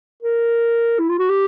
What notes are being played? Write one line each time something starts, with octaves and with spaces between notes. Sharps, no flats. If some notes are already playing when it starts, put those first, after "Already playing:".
A#4
E4
F4
F#4
G4